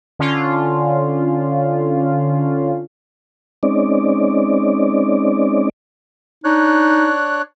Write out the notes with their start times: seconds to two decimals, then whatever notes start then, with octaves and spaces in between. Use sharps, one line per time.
0.19 D3 C#4 F4
3.63 G#3 C4 C#4 D#4 D5
6.44 D4 D#4 C#5 F#6